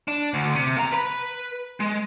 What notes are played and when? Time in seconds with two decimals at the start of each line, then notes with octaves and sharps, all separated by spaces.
0.08 D4
0.34 D2
0.55 C3
0.76 D#2 A#5
0.92 B4 B5
1.80 G#3